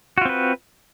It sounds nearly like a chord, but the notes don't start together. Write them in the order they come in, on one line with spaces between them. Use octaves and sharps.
F#4 F4 C4 B4